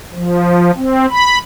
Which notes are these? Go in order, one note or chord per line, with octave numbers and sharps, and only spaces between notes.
F3
C4
B5